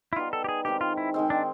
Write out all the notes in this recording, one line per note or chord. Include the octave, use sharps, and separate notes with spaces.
E4
G3 B3 D#4 F4
A4
G4
G#4
D#3 G#3 C4 G4
F4
E4
D#3 G#3 C4
D4